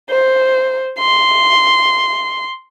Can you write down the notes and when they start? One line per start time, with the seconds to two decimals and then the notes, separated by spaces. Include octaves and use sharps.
0.10 C5
1.00 C6